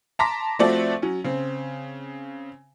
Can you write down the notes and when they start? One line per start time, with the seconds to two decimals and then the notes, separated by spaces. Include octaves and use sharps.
0.19 A5 A#5 C6 D6 A#6 B6
0.59 F3 A3 C4 F#4 A4 D5
1.02 F#3 C#4
1.24 C#3 C4